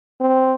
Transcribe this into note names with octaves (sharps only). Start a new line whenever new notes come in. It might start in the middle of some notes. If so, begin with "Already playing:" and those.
C4